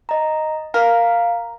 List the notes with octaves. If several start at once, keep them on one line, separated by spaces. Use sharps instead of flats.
D#5 A#5
A#4 F5